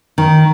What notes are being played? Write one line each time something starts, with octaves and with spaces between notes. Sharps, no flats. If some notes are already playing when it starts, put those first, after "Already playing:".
D#3